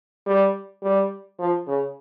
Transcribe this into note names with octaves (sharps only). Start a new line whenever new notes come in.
G3
G3
F3
C#3